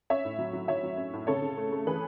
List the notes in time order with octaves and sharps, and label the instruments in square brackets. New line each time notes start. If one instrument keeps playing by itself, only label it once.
[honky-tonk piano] C#4 C#5 E5
A2
F#3
F#3
F#3 C#5 E5
F#3
C#4
A2
C#3 A4 C#5
C#3
A3
A3
E3 G#4 B4